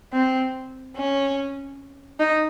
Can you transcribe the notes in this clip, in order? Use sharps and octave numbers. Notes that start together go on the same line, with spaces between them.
C4
C#4
D#4